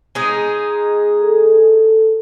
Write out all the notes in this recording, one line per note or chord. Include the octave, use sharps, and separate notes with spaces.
G#3 D#4 G#4
A4